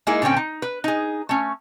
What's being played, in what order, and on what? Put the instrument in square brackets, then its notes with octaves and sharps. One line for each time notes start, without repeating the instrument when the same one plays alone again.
[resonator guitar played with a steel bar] G#3 A#3 D#4 E4 G#4
A#2 D3 C4 C#4 G5
D#4
B4
D#4 G#4
A3 C#4